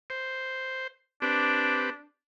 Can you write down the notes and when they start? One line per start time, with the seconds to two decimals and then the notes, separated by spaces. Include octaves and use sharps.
0.10 C5
1.22 C4 D4 G4 B4